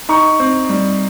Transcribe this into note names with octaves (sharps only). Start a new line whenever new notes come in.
D#4 A#5 C#6
C4
G3